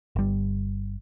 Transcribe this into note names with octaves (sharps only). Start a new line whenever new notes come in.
G1 G3